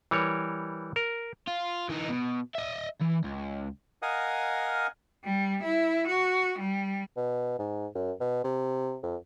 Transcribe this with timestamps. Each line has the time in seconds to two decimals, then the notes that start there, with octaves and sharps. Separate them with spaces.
0.11 E3 G3 A#4 C#5
0.96 A#4
1.48 F4
1.89 E3 D#4
2.09 B2
2.55 D#5 E5
3.01 E3
3.24 C#2
4.02 A#4 D#5 F5 F#5 G#5 D#6
5.24 G3
5.63 E4
6.08 F#4
6.59 G3
7.17 B2
7.59 G#2
7.95 F#2
8.20 B2
8.44 C3
9.03 F2